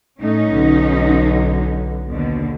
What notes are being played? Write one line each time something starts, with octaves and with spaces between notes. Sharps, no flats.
A2 A3 C#4 D#4
B1 D3
D#2 B2 D3